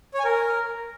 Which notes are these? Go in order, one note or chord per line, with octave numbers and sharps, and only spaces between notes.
C#5
G#5
A#4